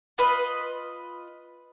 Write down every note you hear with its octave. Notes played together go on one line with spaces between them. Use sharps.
F4 B4 D#5 B5